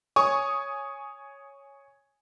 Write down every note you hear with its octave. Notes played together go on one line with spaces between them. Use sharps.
C#5 G#5 C#6 D#6